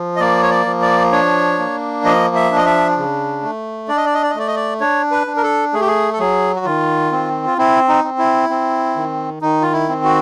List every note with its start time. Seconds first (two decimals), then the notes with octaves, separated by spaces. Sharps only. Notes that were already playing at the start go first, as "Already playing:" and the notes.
Already playing: F3
0.16 D#5
0.20 A#3 D5
0.42 C#5
0.51 D5
0.66 F3
0.82 D5
1.12 D4 C#5
1.59 A#3
2.05 F3 D#5
2.35 E5
2.51 D4
2.56 D#5
2.66 E5
2.97 C#3
3.42 A3
3.88 D4 D5
3.97 D#5
4.06 D5
4.14 D#5
4.23 D5
4.30 D#5
4.35 A3 D5
4.47 D#5
4.56 D5
4.81 D4 C#5
5.11 B4
5.27 D4
5.37 A#4
5.43 A4
5.74 A3 G#4
5.81 G4
5.88 G#4
6.13 A4
6.19 F#3 G#4
6.56 F#4
6.65 D#3 F4
7.12 C4
7.46 F4
7.58 C4 E4
7.88 D#4
8.04 C4
8.19 E4
8.49 C4
8.96 D#3
9.41 D#3 D#4
9.62 F4
9.72 E4
9.89 C4
10.04 F#4